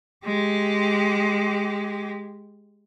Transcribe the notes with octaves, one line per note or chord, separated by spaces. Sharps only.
G#3 G4